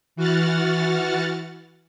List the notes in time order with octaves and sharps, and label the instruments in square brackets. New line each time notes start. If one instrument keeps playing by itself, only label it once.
[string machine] E3 F#4 F#5 F6 A6